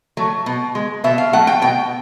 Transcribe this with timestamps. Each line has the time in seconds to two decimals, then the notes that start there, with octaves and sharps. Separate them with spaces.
0.17 F#3 A3
0.46 B2
0.75 G#3
1.04 B2 E5
1.18 F5
1.33 F#3 A3 F#5
1.47 G5
1.62 B2 G5